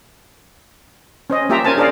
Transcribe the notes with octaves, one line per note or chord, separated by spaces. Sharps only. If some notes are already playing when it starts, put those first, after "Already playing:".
C#4 C5 D#5
A#3 F4 G4 E5 G5 A#5
C#4 A#4 C5 G#5 A5
D4 G#4 A#4 C5 D5 F5